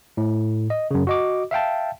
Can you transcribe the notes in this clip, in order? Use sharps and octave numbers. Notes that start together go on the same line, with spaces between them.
A2
D#5
F#2 C#3
F#4 D#5 D6
E5 F5 G5 A5